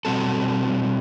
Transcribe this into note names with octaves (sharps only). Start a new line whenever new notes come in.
B2 G3 C4 F#4 A4